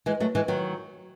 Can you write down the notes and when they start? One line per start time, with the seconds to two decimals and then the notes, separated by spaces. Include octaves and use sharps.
0.06 E3 G#3
0.20 F#3 A3
0.35 E3 G#3
0.48 D#3 F#3